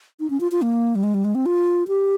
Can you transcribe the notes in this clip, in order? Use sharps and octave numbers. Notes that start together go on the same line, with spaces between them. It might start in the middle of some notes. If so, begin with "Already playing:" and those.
D#4
C#4
F4
F4
A#3
G3
G#3
G3
G#3
C4
F4
G4